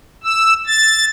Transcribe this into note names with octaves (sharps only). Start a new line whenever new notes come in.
E6
A6